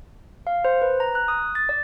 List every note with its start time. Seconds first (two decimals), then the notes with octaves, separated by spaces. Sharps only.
0.47 F5
0.65 C5
0.82 B4
1.00 A#5
1.15 F#6
1.28 D#6
1.55 A6
1.69 D5